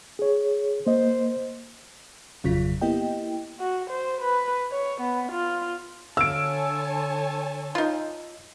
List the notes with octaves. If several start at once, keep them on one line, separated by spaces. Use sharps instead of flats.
G#4 C#5
A#3 C5 D#5
G#1 F2 C#3 F#3 F4 B6
A#3 B3 E4 G4 D#5 G5
F#4
C5
B4
C#5
B3
F4
D3 C#5 F5 G#5 A5 E6 D7
D#4 F4